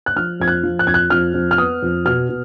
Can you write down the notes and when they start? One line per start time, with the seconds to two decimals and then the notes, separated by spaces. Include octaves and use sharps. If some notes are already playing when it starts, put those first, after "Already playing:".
0.06 F#6
0.16 F3 F6
0.40 F2 G#6
0.48 F#6
0.63 F3
0.79 F#6
0.87 F2 G#6
0.94 F#6
1.10 F2 F6
1.34 F2
1.51 F6
1.58 B3 D#6
1.82 F2
2.05 B2 F6
2.29 B2